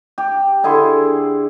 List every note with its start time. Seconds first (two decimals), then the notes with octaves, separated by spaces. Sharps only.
0.18 G4
0.64 D3 E4 G#4 C6